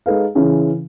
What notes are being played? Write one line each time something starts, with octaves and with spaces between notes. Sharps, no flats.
G#3 D#4 A4 B4 F5
C#3 E3 C#4